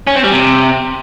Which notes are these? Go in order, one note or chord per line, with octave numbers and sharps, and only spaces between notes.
C#4
C4
G3
C3